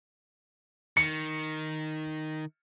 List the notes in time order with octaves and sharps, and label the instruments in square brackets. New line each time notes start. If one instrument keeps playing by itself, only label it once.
[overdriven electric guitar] D#3 [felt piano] C#7